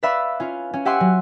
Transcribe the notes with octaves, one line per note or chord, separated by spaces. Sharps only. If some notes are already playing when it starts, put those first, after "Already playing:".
B4 D5 E5 F5 B5
C#4 F4
C#4
G4 E5 F#5 G#5 C6
F#3